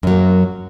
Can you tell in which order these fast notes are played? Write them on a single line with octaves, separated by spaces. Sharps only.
F#2 F#3 A#3